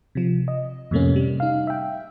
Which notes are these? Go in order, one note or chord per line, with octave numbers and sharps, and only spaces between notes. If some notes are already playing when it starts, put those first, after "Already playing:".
C3 F3
D#5
F2 A2 C3 A3 A#3 C#4
C3 G3
D#4 F5
E5 G5